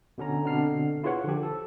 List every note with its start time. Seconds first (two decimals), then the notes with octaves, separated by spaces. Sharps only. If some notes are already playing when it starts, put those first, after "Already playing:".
0.18 B2 D3 C#4 A#5
0.44 B2 D3 C4 D4 F6 C7
1.03 E4 F4 G#4 B4 C#5 F#5
1.25 D3 F3 G4
1.43 A4